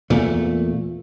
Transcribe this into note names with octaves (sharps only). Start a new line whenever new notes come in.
E2 A#2 A3